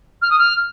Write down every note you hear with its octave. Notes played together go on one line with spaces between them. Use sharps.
F6
D#6
F6